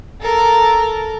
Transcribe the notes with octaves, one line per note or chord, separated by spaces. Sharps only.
A4 A#4